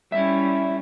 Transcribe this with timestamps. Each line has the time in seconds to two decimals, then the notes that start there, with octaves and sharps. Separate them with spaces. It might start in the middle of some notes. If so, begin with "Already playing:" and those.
0.12 G3 C#4 E4 E5